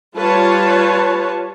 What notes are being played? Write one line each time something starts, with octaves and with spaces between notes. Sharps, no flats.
G3 F4 B4 C#5 A5